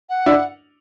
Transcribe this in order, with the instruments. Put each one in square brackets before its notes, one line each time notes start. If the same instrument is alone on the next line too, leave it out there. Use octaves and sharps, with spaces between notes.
[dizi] F#5
[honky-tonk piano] D4 E4